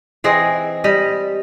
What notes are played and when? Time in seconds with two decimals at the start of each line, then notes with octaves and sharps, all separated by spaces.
0.24 E3 C4 G#4 D#5
0.84 G3 D#5